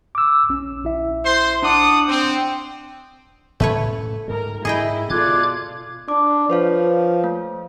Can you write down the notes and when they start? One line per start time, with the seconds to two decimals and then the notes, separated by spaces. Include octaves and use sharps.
0.15 D6 E6
0.49 A#1 C#4
0.84 A#1 E4 E5
1.24 C5 C6
1.63 D4 D5 F#5 A5 D6 D#6
2.08 C4
3.60 A2 A3 C#4 B4 C#5
4.28 G#2 G3 A#4
4.65 G#2 E4 G#4 D#5 G5
5.10 B2 F4 A4 D5 D6 F#6 G#6
6.08 D4 D6
6.50 F3 B4 C#5 F5
7.24 A3